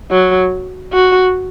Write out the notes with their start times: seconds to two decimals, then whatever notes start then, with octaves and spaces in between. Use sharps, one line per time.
0.11 F#3
0.92 F#4